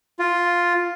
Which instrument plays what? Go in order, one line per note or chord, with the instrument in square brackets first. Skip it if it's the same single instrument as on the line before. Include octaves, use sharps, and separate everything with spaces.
[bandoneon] F4